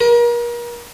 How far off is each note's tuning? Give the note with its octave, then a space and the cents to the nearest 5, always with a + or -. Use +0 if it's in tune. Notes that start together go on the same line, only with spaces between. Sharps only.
A#4 +35